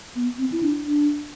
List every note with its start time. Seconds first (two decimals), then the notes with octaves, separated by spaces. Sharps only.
0.16 B3
0.38 C4
0.52 E4
0.63 D4
0.86 D4